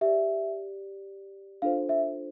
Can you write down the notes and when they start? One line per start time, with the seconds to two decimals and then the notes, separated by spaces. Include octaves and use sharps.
0.01 G4 D5 E5
1.62 D4 F4 A4 C5 F5
1.89 E5